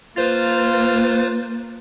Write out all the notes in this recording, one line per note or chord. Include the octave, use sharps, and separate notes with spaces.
A#3 F4 B4 C5 A6